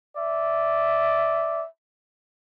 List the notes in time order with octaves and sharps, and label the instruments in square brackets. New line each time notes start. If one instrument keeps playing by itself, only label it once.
[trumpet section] D5 E5